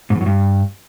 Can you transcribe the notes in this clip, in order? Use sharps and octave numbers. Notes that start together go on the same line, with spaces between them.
G#2
E2
F#2
G2